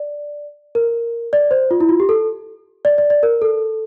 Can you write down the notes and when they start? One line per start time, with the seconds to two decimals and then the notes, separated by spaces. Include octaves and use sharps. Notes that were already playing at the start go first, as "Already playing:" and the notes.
Already playing: D5
0.75 A#4
1.33 D5
1.51 C5
1.71 F4
1.80 E4
1.89 F4
2.00 G4
2.09 A4
2.85 D5
2.98 D5
3.10 D5
3.23 A#4
3.42 A4